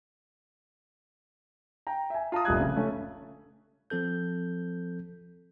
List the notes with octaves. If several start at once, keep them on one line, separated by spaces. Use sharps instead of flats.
G5 A#5
E5 G#5
F4 A5 A#5 D#6
F1 A#2 G3 D#6 F#6 G#6
C#3
A3 C#4
F3 C4 A4 G6